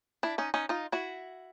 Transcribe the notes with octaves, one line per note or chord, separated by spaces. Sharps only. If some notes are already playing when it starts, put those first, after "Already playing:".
D4 E4
C#4 D#4
C#4 D#4
D#4 F4
E4 F#4